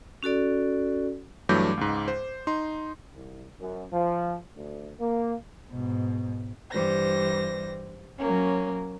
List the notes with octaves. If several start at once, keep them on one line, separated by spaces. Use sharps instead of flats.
C#4 F#4 A4 D5
G2 E3 F#3 A3 D6 G6
C#2 G#2
C5
D#4 C6
C2
F#2
F3
D2
A#3
G#2 B2
G2 E3 G3 C5 A#6
F#3 A#3 C#4